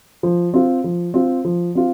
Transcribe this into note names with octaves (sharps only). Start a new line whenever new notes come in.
F3
C4 F4
F3
C4 F4
F3
C4 F4